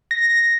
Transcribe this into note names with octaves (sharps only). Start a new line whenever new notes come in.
A#6